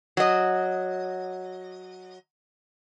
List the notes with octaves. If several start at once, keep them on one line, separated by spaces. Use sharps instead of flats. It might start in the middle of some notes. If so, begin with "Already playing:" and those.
F#3 D#5